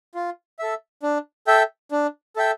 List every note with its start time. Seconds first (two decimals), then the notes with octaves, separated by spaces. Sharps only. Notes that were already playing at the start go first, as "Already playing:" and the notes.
0.15 F4
0.59 A4 E5
1.03 D4
1.47 A4 E5 G5
1.91 D4
2.36 A4 E5 G5